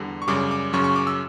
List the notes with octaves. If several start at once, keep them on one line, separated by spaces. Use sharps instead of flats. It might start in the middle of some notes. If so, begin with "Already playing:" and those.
Already playing: E2 D3 G3
C#6
F#2 C#3 G3 D6
D6
F#2 C#3 F#3 C#6
C#6
D6
E6